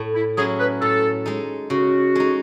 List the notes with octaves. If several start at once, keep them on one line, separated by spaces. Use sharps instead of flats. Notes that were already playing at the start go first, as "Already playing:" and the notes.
Already playing: A2
E4
F#3 C#4 E4 G#4
B4
A2 A4
G#3 D#4
C#3 F#4
G#3 D#4